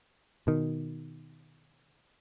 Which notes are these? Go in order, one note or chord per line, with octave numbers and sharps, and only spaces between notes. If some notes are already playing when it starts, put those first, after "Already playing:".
B2 D#3